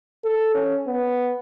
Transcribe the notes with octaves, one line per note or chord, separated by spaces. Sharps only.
A4
C#4
B3